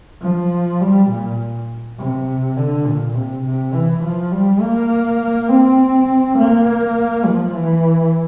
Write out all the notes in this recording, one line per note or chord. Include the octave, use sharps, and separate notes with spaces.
F3
G3
A#2
C3
D3
A#2
C3
C3
E3
F3
G3
A#3
C4
A#3
F3
E3